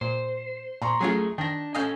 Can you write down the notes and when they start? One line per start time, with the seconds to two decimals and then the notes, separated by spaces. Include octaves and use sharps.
0.01 A#2 C5
0.82 A#2 A#5 C6 C#6
1.01 F#3 A3 C#4 F4 G#4
1.38 D#3 D4 G5 A#6
1.75 C#4 A4 D#5 F5 G#5 G6